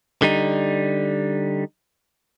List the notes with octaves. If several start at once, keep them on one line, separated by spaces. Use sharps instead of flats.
D3 G3 D#4